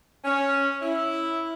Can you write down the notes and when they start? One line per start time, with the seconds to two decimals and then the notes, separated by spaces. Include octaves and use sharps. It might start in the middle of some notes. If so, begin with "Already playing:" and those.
0.25 C#4
0.82 E4